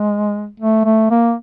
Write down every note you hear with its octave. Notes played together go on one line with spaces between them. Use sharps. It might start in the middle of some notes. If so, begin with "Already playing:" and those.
Already playing: G#3
A3
A3
A#3